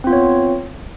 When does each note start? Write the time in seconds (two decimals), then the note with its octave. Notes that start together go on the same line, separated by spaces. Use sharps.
0.04 C4
0.07 F4
0.10 B3
0.13 C#5